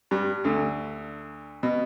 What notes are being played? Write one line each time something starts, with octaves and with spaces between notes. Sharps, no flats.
G2 G3
D2 D3
B2